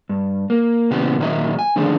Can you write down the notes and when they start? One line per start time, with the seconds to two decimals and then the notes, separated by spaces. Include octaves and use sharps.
0.09 G2
0.50 A#3
0.91 A#2 C#3 E3 B3 G4
1.19 A#2 D#3 F#3 B4 D#5 E5
1.59 G#5
1.76 D3 D#3 F3 A3 D4 G#4